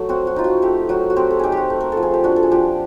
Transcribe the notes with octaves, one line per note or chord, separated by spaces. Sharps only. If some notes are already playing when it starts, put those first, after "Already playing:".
Already playing: F#3 A3
C4 F#4
F#4
D#4 F4
F#4
A3 G4
F#3 F#4
F#4
C4 G4
A4
D#4 G4 G#4
F#4 G4
A3
A#4
A4
F3
G#4
G4
D4 F#4
A4
G#4
F3 G4